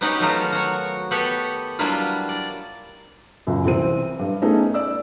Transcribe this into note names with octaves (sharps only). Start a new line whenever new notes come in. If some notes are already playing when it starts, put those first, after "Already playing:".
B3 C#4 D#4 F#4 G4 B4
D#3 F#3 A3 B3 F4 A#4
F#4 C#5
B3 G4 A4 B4 C#5
F#3 G3 A#3 D4 E4 F4
D5
C#2 F#2
C2 E3 C4 D#7
G2
A3 B3 C#4 D#4 G#4
D5 E6